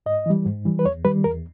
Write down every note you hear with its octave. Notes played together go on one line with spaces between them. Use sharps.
G#2 D#5
E3 G3
G#2
E3 G3
B4
E2 C#5
D#3 G3 B4
E2 A#4